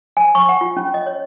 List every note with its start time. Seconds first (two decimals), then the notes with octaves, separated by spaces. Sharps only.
0.17 G#5
0.35 C#6
0.49 F#5
0.61 F4
0.77 C#4
0.94 D#5
1.06 C#5